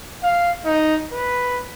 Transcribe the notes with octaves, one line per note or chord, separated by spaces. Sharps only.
F5
D#4
B4